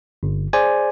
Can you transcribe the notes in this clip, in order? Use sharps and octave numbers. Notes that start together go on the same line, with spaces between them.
G1
G#4 C5 D5 G#5